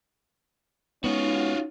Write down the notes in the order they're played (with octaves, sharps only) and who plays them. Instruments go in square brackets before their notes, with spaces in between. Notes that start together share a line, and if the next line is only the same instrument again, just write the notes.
[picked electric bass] G#3 B3 [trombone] C#4 [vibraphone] D#4 [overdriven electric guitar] F4 F#4